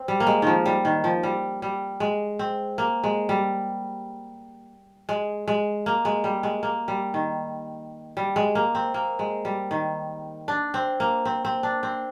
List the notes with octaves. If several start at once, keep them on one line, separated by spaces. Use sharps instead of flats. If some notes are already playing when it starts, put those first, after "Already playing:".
Already playing: C4
G3
A#3
G#3
D#3 F3
G3
D#3
F3
G3
G3
G#3
C4
A#3
G#3
G3
G#3
G#3
A#3
G#3
G3
G#3
A#3
G3
D#3
G3
G#3
A#3
C4
A#3
G#3
G3
D#3
D4
C4
A#3
C4
C4
D4
C4